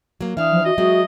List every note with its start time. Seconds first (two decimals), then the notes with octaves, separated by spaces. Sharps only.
0.21 F#3 A#3
0.37 E3 D4 E5 F5 D#6
0.51 F3
0.65 F#4 D#5
0.78 F#3 G#3 C4 F#4